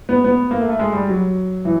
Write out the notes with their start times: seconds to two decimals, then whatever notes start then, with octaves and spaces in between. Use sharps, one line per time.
0.09 B3
0.24 B3
0.51 A#3
0.60 A3
0.70 A3
0.79 G#3
0.93 G3
1.08 F#3
1.65 E3